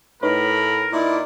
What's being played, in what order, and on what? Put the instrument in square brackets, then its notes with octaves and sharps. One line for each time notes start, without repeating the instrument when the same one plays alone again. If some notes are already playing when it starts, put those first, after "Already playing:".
[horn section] A2 B5 [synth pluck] D#4 B4 C#5 [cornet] A#4
[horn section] A#2 D#4 D5 [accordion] E4